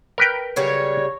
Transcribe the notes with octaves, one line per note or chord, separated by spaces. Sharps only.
A#4 B4 G5
C#3 F#3 G3 C#5